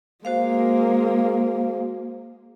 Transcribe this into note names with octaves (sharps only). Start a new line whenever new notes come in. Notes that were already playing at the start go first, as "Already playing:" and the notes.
G#3 A#3 F#4 C5 F5